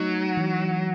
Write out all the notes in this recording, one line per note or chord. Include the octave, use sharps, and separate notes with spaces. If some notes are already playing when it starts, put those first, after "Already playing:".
Already playing: F#3 A3 D#4
E3